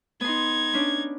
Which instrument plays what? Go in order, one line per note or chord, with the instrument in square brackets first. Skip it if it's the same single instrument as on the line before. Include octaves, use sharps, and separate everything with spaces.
[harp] B3 C6 [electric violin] D#4 G#6
[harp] C#4 D4